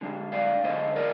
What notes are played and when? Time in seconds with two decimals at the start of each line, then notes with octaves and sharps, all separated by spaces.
0.01 D3 G#3 D4
0.32 D5 F5
0.64 D3 G#3 D4 C5 D#5
0.96 A#4 D5